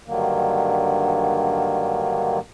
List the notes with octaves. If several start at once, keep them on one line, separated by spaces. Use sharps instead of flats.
G2 D3 D#3 F#3 A#3